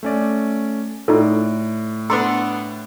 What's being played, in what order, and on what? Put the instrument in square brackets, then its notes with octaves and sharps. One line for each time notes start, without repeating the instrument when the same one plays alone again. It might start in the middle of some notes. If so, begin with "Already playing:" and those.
[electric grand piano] A3 C#4 D5
[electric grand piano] A2 D5 [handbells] D#4 F4 A4
[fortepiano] B3 D4 A4 [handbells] A#5 C6 E6